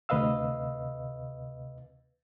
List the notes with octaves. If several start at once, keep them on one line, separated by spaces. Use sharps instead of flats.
D2 C3 B4 D#5 F5 E6